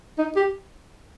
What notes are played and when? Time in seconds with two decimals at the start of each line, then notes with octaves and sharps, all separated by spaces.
0.18 D#4
0.36 G4